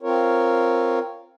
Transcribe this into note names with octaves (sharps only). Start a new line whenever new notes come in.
C4 F4 A#4 C#5